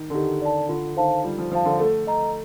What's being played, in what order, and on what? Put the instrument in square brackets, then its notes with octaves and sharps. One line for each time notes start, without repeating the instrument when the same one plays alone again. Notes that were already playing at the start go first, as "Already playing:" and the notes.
Already playing: [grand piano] D#3
D3
[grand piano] D#3 [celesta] G4
[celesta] D5 A5
[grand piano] D3 [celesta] F4
[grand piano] D#3 [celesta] C5 F5 A5
[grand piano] G3 [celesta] F4
[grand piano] F3
[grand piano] F3 [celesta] C5 F5 A5
[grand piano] D3
[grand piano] A3 [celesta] A4
[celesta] D#5 A#5